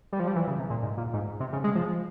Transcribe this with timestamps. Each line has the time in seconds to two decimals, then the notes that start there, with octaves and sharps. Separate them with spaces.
0.13 G3
0.20 F3
0.27 G3
0.36 E3
0.47 C#3
0.59 C3
0.70 A#2
0.82 G#2
0.98 A#2
1.14 G#2
1.40 C3
1.53 C#3
1.64 G#3
1.75 F3